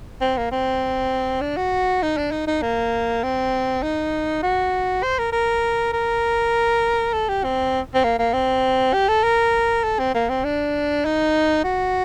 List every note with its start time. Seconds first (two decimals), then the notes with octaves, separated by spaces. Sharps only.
0.21 C4
0.37 A#3
0.52 C4
1.41 D4
1.57 F#4
2.02 D#4
2.17 D4
2.32 D#4
2.47 D#4
2.62 A#3
3.23 C4
3.83 D#4
4.43 F#4
5.03 C5
5.18 A#4
5.32 A#4
5.93 A#4
7.13 A4
7.29 G4
7.44 C4
7.95 C4
8.04 A#3
8.19 A#3
8.33 C4
8.93 G4
9.08 A4
9.24 A#4
9.84 A4
9.99 C4
10.15 A#3
10.29 C4
10.44 D4
11.05 D#4
11.64 F#4